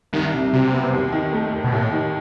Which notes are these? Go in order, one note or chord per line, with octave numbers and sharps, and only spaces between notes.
C2 D#3
C3
C3 F#3
B3
D#2
D#3
A3
D#2
B2
D#2 A2
D#3